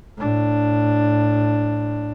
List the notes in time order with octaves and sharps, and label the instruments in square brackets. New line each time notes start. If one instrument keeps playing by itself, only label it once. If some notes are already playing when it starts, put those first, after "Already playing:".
[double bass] A2 D4